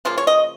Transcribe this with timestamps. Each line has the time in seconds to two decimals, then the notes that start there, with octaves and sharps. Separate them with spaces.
0.05 C#3 F3 A#3 F4
0.18 C#5
0.27 D#5